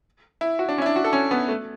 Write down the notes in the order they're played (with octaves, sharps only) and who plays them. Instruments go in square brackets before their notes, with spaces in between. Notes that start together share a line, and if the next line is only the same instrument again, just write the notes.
[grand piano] E4
F#4
D4
C#4
E4
D4
F#4
A4
C#4
B3
A3